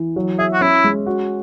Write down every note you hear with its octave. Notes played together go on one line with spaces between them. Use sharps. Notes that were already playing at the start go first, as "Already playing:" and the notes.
Already playing: E3
F#3
G#4 E5
F#4
C#4 E4
G#3
F#4